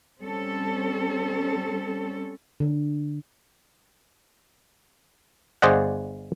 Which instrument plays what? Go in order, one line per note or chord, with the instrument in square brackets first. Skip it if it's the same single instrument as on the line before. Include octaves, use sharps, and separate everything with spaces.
[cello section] G3 C4 C#4 A4
[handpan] D3
[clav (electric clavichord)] G1 G#4 C5 D5 D#5 F#5